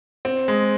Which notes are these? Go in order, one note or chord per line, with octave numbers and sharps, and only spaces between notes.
C4
G#3